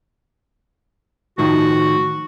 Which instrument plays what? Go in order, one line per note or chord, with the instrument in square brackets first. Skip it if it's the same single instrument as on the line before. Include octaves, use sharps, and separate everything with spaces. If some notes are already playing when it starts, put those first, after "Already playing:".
[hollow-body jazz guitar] A2 D#3 F3 [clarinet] F#4